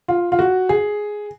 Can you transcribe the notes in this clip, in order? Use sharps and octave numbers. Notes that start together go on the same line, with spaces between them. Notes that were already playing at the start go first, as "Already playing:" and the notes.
F4
F4
F#4
G#4